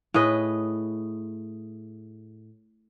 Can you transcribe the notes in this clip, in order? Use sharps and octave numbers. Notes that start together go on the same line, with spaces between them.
A2 G#4 B4 D#5